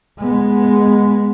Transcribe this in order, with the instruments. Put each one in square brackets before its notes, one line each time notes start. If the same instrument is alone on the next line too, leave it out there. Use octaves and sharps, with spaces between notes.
[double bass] G#3 B3